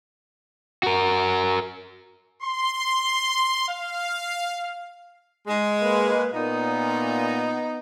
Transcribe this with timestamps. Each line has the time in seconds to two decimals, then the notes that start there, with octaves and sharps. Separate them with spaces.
0.83 F#4 A#4
2.41 C6
3.68 F5
5.47 G#3
5.81 A#3 B4
6.33 A#2 B3 D#4